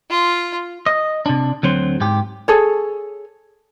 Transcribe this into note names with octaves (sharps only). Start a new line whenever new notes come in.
F4
D#5
C3 D4
D2 F#3 C4
G#2 G4
G#4 A4 C#5